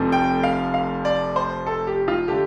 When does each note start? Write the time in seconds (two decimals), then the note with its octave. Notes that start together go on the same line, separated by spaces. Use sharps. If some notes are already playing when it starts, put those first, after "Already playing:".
Already playing: F1 F2 F3 A3
0.12 G5
0.43 F5
0.74 F5
1.05 D5
1.36 C5
1.66 A4
1.87 G4
2.08 F4
2.28 D3 A3 G4